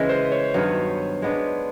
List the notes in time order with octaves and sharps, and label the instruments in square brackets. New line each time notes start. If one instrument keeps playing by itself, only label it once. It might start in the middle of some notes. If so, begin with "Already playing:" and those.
Already playing: [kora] C#3 E3 G#3 [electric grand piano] B4
[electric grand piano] C5
C#5
[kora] G2 D#3 F#3 B3
G#3 B3 D4